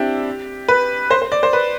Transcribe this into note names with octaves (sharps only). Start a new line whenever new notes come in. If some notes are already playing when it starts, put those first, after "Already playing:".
Already playing: C4 D4 E4 G4
B4
C5
C5
D5
C5
B4